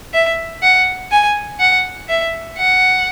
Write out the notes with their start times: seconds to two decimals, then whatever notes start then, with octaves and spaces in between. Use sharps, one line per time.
0.14 E5
0.63 F#5
1.11 G#5
1.60 F#5
2.09 E5
2.58 F#5